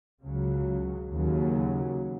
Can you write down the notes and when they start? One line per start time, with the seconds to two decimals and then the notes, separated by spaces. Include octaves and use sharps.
0.23 C#2 C#3 F#3
1.11 D#2 C#3 F#3